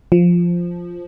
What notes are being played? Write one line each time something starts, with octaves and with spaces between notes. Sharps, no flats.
F3